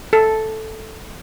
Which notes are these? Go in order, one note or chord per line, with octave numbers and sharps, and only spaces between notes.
A4